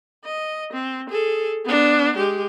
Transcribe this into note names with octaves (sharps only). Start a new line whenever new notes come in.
D#5
C4
G#4 A4
B3 D4
G#3 G4